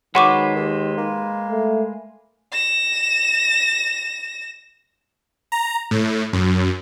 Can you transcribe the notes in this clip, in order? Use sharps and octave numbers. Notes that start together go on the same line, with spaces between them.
D#3 F#3 G#3 B4 C5 F#5 C#6 D6
D#2
A#3
A3
A#6 E7
A#5
A2
F#2